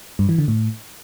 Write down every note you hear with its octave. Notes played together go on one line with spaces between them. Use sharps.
G2
E3
D3
A2